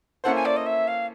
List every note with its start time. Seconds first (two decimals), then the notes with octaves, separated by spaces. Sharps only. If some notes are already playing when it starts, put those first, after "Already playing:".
0.24 A#3 C#4 E4 A4 C5 F#5
0.35 G#5
0.45 D5
0.56 D#5
0.66 E5
0.87 F5